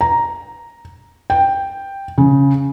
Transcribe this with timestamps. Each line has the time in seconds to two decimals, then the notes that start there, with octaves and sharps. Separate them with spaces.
0.01 A#5
1.30 G5
2.18 C#3